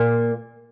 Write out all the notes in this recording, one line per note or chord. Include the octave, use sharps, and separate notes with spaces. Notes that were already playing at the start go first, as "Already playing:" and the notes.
Already playing: A#2 A#3